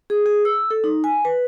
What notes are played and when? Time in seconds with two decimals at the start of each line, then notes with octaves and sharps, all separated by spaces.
0.10 G#4
0.26 G#4
0.45 E6
0.71 A4
0.84 D#4
1.04 G#5
1.25 B4